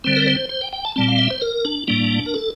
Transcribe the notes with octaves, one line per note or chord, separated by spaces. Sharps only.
D3 G3 C4 C5
A#4
C5
C5
G5
G5
A5
A#2 G3 C4 A5
F5
E5
C5
A#4
D4
A2 G3 A#3 D4
A#4
A4